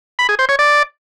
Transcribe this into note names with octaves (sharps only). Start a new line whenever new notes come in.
B5
G#4
C5
C#5
D5